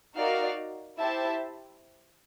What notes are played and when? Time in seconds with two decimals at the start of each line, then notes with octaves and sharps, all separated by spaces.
0.15 D#4 F#4 A#4 D5 F5
0.99 E4 G4 C5 E5 A5